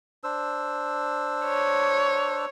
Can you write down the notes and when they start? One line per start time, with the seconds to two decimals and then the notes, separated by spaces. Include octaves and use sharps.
0.24 D4 C5 E6
1.46 C#5